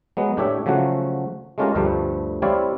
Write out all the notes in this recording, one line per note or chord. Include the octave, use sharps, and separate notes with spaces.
F#3 G#3 B3
A2 D4 G4 C#5 E5
C#3 F3 F#3 A3 F#4
G#3 A3 C#4 F4 G4 A#4
D2 G2 F3 G3 A3
G3 C4 E4 C#5 D5 F5